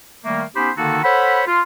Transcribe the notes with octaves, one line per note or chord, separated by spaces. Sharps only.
D#3 G3 A3 A#3
B3 C#4 D#4 G4 C5 B5
D3 D#3 A#3 D#4 F#4 A4
A4 C5 C#5 F#5 B5
F4